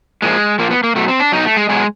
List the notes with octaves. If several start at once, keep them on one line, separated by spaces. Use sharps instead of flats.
A#2 F3 G#3
A#2 F3 A#3
B3
A#3
B2 F#3 A3
C4
D4
B2 F#3 D#4
A3
G#3
B2 F#3 G#3